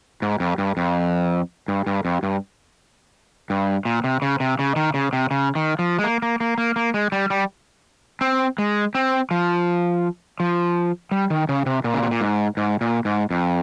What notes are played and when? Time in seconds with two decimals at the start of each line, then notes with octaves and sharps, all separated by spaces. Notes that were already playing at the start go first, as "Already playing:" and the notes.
0.22 G#2
0.40 F2
0.58 G2
0.77 F2
1.68 G2
1.87 G2
2.05 F2
2.23 G2
3.50 G2
3.85 A#2
4.04 C3
4.22 C#3
4.40 C3
4.59 C#3
4.76 D#3
4.94 C#3
5.13 C3
5.31 C#3
5.55 D#3
5.79 F3
5.99 G#3
6.04 A#3
6.22 A#3
6.40 A#3
6.58 A#3
6.76 A#3
6.94 G#3
7.12 G3
7.30 G3
8.21 C4
8.58 G#3
8.95 C4
9.31 F3
10.40 F3
11.11 G3
11.30 D#3
11.49 C#3
11.66 C3
11.84 A#2
11.94 C#3
12.03 C3
12.11 A#2
12.21 G#2
12.57 G#2
12.81 A#2
13.05 G#2
13.31 F2